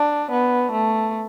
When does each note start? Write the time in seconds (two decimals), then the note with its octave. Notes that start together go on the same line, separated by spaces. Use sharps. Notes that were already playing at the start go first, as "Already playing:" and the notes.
Already playing: D4
0.31 B3
0.72 A3